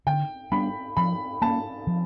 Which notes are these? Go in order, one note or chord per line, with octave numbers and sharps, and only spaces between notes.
D3 G5
G3 B3 D4 B5
F3 B5
A#3 C#4 A5
F3